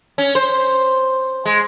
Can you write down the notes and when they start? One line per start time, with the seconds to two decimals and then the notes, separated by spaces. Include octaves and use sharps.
0.18 C#4
0.35 C5
1.45 G#3